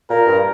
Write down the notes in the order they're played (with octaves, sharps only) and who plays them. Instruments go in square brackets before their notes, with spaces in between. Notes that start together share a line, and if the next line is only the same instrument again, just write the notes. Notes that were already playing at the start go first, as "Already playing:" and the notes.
[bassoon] A#2 [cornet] A#4
[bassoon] G2